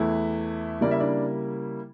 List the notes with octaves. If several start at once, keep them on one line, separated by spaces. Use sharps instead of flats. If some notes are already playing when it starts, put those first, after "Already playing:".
Already playing: E2 E3 A3 E4
C#3 G3 A#3 E4 D5
E5
D4 D5